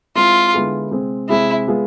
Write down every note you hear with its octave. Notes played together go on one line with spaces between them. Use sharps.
G#3 C4 E4 F4
D3 G#3 B3 E4 G#4
C3 G#3 C4 G#4
C3 G#3 C4 E4 G#4
G#3 B3 F4 G#4